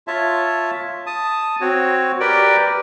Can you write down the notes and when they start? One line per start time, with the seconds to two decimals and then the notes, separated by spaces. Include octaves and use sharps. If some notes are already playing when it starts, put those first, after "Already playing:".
0.08 F4 C#5 E5 A5
1.06 A5 D#6
1.61 C4 F#4 C#5
2.20 G4 A#4 B4 D5 G5